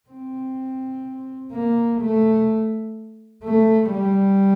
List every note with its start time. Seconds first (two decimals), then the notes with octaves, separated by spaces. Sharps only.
0.09 C4
1.52 A#3
2.01 A3
3.44 A3
3.92 G3